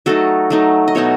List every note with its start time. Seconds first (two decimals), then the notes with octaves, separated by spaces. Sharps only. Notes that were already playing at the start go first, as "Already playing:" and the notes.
0.06 F#3 A3 D#4 F#4 A4
0.50 F#3 A3 D#4
0.88 D#5
0.95 B2 A3 D#4 C#5 E5